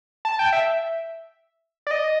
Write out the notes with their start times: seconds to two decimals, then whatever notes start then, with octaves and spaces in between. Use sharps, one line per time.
0.25 A5
0.39 G5
0.53 E5
1.87 D5
1.91 D#5